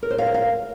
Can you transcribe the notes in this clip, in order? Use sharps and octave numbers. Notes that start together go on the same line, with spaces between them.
A#4
C5
F5
A#4
F5